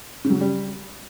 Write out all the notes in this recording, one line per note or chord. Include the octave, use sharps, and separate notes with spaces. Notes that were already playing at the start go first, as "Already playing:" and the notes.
C#3
F#3
C#3
G3